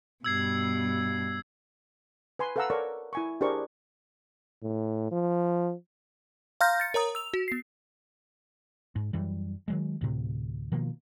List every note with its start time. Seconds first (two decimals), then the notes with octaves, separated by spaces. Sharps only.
0.24 G2 B2 E6 G#6 C7
2.39 B4 G#5 C6
2.56 A4 B4 F5 F#5 A#5 E6
2.70 A4 A#4 C#5 D5 C#6
3.13 E4 G#5 C#6
3.41 D4 G4 G#4 A#4 C5 C#6
4.63 A2
5.11 F3
6.61 F5 A#5 C6 F6 G6 A#6
6.80 A6 C#7
6.94 A#4 C#5 A#5 D#6
7.15 E6 F7
7.34 F#4
7.48 B3 C7
8.96 G#2
9.13 F#2 E3 G3
9.68 D#3 F#3 G#3
10.01 D2 A2 C3
10.72 B2 D#3 F3 A#3